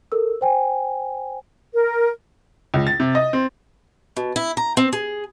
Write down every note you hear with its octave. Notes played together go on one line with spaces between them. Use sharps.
A4 A#4 E6
C5 G5 G#5
A#4
C#2
A6
C3
D#5
C4
B2
E4
A#5
C4
G#4